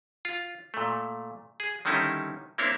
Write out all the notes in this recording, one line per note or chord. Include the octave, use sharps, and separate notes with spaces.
F4
A#2 A3
G#4
D3 D#3 G3 C#4 D#4 E4
A#3 C4 D4 E4 C#5